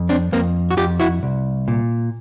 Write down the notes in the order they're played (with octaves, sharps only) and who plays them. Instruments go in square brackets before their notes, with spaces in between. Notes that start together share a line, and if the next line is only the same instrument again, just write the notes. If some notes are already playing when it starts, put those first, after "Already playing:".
Already playing: [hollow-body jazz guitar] F2
C4 D4
F2 A#3 C4
F#4
F2 F4 G4
E4 F#4
C2
A#2